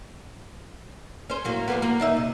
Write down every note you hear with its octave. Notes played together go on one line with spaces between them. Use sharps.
C#4 C5
A2 F#3 A#3
F3 A#3 B3
A#3
D#3 D#4 E5
C3